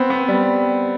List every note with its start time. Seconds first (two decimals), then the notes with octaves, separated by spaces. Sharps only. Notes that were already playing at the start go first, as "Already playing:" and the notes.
Already playing: B3 C4
0.10 B3
0.28 G3